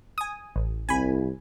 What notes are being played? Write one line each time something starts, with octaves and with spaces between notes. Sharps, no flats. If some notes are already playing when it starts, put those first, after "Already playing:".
G#5 D#6
A1
C2 G#5 B5